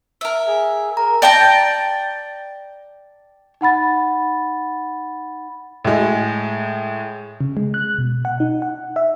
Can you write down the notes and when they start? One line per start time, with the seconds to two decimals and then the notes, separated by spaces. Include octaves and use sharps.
0.21 A#4 E5
0.47 G#4
0.97 A#4 A#5
1.22 D5 G5 A5 A#5
3.61 D#4 F#5 B5 A6
5.85 A2 G#3
7.41 C#3
7.57 G#3
7.74 F#6
7.98 B2
8.25 F#5
8.40 D#4
8.62 F#5
8.96 E5